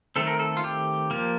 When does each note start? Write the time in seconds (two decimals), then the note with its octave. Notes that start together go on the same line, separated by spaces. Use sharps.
0.16 D#3 A3 C4 A4
0.27 A#4
0.39 A4
0.57 F4
0.64 G4
1.11 F3 A#3